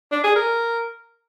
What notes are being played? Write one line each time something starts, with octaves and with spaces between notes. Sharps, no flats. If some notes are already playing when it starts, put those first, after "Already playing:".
D4
G#4
A#4